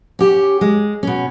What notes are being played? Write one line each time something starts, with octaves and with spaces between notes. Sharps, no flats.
C#4 G4
G#3
B2 C#4